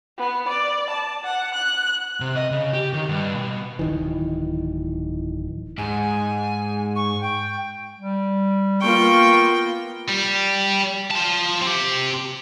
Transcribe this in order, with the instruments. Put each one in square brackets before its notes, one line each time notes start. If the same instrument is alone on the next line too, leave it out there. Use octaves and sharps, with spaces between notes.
[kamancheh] B3
D5
A5
F#5
F#6
[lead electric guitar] C3
D#5
C#3
G4
D#3
G2
B2
[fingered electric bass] D1 D#3 E3
[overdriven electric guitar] G#2 [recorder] G#5
[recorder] C#6
G5
[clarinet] G3
[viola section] A#3 B3 F4 [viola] G5 [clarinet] C#6
[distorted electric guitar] G3
F4 A5
C4 G4